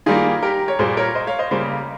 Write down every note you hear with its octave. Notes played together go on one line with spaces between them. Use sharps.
D#3 G3 A#3 F4 G#4
G4 A#4
C#5
A#2 G3 A#3 G#4 C5
A#4 C#5
C5 D#5
C#5 F5
C5 D#5
C#3 G3 A#3 G#4 C5